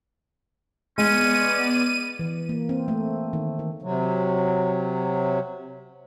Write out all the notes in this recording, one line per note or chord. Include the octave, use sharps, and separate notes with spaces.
G#3 B3 C#4 D5 D#7
E3
A#3
C4
A3
D#3
D#3
C3 F#3